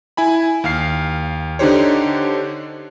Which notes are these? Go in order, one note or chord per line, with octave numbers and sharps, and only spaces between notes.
E4 G#5 B5
D#2 F5 F6 C7
D3 D4 D#4 G4 C5 C#5